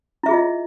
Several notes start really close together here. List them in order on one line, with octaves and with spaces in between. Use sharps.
E4 E5 G#4 F4 D#5